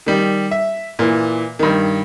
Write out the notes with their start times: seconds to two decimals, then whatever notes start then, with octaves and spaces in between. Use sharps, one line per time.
0.06 D#3 G3
0.51 E5
0.99 A#2 E3
1.59 G2 D#3